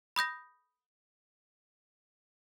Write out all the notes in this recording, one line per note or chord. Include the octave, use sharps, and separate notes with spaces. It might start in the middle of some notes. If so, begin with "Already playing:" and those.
B5 D#6 G6 A#6